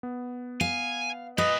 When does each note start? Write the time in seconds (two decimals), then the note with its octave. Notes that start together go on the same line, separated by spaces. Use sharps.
0.03 B3
0.61 F5 G#5
1.38 A#2 B4 D#5